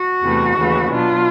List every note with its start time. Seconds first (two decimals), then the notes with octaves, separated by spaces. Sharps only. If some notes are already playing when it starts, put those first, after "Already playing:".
Already playing: F#4
0.23 E2 C3 E3 A3
0.57 D#2 C#3 E3 A3
0.90 B2 F#3 B3 D4 F4